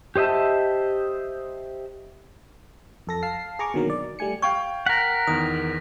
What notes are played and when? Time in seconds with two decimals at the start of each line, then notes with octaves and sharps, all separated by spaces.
0.16 G4 C5 D#5 E5 A5
3.07 F2 A4 A#6
3.23 F5 A5 C7
3.59 G#4 A#5 C#6 D6
3.74 B2 D3 D#3 F#3 A#3 A#4
3.90 D5
4.19 G3 A3 G#5 C#7
4.42 F5 G5 C#6 G#6
4.86 A#4 F#5 A#6 B6
5.27 E2 D#3 D#6